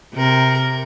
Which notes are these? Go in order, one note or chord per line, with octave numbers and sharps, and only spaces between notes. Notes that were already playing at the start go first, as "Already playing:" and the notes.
C3 A#4